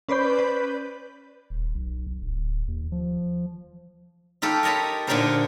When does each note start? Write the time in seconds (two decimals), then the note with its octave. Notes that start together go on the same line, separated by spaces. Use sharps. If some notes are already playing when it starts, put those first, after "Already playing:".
0.09 C#4 B4 C5 D5 B5 G6
0.39 B4
1.50 D#1
1.75 B1
2.07 B1
2.22 D1
2.68 D#2
2.92 F3
4.42 D#4 F4 G4 A4
4.63 A#4 C#5 D#5 A5 B5
5.07 A#2 D3 D4 D#4 A#4 C5